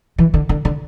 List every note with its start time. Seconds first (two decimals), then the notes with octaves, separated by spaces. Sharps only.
0.18 E3
0.34 D3
0.49 D3
0.65 D3